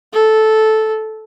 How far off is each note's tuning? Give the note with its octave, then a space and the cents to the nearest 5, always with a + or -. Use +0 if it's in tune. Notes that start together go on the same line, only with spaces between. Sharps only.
A4 -10